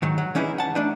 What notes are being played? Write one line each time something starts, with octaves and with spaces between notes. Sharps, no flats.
G#2 D#3 F#3
F#3
E3 C#4 D#4 E4 G#4 B4
F#5 A5
A3 D4 D#4